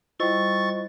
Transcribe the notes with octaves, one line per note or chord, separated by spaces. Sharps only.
G3 E4 F4 C5 D#5 C#6 A6